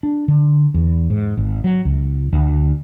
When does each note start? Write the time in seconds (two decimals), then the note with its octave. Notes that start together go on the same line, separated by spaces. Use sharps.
0.03 D4
0.28 D3
0.74 E2
1.10 G#2
1.37 G#1
1.64 F#3
1.85 C#2
2.33 D2